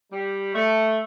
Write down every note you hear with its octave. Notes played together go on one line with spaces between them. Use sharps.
G3
A3